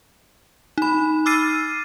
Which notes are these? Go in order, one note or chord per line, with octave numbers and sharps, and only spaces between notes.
D#4 B5
D6 E6 F6 A6 C7 D#7